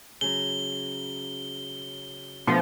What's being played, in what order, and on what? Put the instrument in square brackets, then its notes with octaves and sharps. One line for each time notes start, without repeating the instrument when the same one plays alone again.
[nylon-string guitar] C#3 F#3 [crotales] G7
[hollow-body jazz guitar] B2 A3 B3 [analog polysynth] F3 [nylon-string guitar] D4